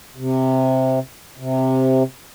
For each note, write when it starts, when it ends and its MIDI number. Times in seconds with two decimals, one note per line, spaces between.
0.16 0.99 48
1.38 2.03 48